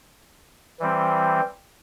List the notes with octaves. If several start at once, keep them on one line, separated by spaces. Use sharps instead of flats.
E3 G3 C4